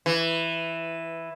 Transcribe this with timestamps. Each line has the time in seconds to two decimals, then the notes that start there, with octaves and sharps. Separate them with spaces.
0.06 E3